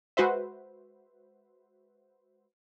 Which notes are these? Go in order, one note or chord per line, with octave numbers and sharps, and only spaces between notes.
G#3 F#4 B4 C5 E5